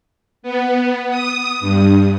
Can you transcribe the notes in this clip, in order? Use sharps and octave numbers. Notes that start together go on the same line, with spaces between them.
B3
D#6
G2